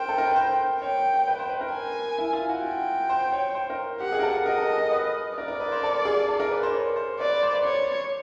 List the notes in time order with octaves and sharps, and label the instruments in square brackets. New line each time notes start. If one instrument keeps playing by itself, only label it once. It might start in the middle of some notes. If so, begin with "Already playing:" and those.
Already playing: [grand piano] A#4 C5 [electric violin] G5
[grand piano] A4
A#4
B4
C5
[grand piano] C#5 [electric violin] G5
[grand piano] B4
C5
B4
A#4
[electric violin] G#5
[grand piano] E4
F4
F#4
[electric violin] G5
[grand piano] C5
C#5
C5
A#4
[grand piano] G4 [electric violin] F#5
[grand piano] G#4
A#4
A4
F#4
[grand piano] A#4 [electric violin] D#5
[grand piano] A4
A4
B4
[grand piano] A#4 [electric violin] D5
[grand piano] A#4
B4
C5
A4
G#4
A4
A#4
B4
C5
C#5
C5
[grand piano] B4 [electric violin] D5
[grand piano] C5
B4
[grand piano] C5 [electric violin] C#5